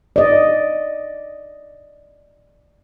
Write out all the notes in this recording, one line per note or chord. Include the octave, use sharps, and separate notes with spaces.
D5 D#5